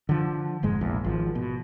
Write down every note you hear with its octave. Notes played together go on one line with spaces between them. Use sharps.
D3 F3
F1 G#2 G#3
A#1 E2
G#1 F3
B2